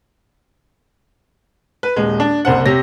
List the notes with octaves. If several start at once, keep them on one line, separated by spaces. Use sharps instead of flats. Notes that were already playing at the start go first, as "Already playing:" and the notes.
B4
D#1 G#3
D4
F#1 C2 C5 F#5
C3 G4 C#5 A#6